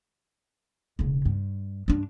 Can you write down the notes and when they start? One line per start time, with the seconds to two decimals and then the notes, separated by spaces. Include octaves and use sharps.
0.99 E1 C#3
1.25 G2
1.88 G2 D4